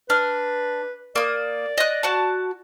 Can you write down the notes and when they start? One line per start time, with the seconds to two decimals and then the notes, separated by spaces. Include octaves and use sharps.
0.10 D4 B4 F6
1.16 A#3 D5 D#6
1.78 D#5 F#6
2.03 F#4 F#5 A5